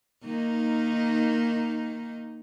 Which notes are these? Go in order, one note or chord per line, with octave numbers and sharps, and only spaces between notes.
D#3 A#3 D#4